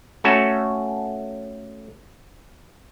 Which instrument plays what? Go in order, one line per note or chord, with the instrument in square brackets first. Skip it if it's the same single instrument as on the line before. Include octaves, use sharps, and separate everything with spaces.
[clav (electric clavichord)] A3 C#4 F#4 A4